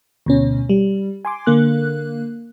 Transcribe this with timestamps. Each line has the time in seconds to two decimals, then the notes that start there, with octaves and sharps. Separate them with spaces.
0.26 D2 B2 C#4
0.69 G3
1.25 G#5 C6 D6
1.47 D3 A#3 F#6